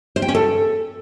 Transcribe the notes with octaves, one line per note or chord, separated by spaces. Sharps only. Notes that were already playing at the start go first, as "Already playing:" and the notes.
C5
G5
C#4
A4